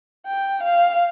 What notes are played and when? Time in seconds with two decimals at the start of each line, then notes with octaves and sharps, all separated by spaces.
0.27 G5
0.63 F5